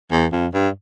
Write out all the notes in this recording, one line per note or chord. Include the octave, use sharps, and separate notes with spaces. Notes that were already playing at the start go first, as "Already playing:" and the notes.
E2
F2
G2